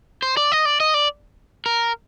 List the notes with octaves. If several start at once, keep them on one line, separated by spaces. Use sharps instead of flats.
C5
D5
D#5
D5
D#5
D5
A#4